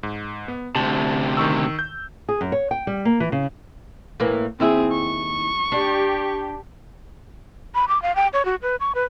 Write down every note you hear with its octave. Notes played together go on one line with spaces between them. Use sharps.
G#2
B3
D2 C3 A5
D#3 C#6 E6
G6
G#4
F#2
C#5
G5
G3
A#3
E3
C#3
A2 E3 A#3
D#2 C4 E4 G#4 E5
C#6
D4 G4
B5
D6
F5
G5
C#5
F#4
B4
C#6
B4